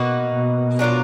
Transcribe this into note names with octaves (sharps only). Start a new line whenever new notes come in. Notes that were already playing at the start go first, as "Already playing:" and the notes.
Already playing: B2 A#3 D#4 F#4 B4
B2
F#3 D4 F4 A#4